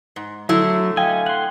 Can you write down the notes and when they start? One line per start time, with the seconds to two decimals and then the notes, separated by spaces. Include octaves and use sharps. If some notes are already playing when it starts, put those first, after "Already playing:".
0.16 G#2
0.49 D3 F#3 A3 E4
0.97 D#5 F5 G5 G#5
1.26 F#5 C6 F#6